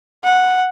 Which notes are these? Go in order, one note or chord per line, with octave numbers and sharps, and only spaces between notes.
F#5